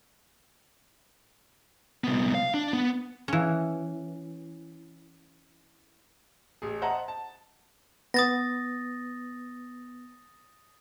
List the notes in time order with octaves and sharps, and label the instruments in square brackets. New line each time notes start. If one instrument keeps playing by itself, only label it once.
[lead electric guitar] C2 B3
F5
D4
B3
[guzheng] E3 C#4
[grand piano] A1 G#4
C5 D#5 E5 F#5 A5 A#5
A5
[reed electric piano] B3 [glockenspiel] D#6 A6 A#6